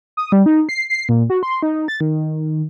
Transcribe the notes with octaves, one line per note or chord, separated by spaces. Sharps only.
D#6
G3
D#4
C7
C7
A#2
F#4
C6
D#4
A6
D#3